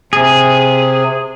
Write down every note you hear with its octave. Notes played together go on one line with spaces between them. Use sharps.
C3 G#4